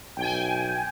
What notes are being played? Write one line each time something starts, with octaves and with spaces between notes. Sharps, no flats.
B1 G5 G#5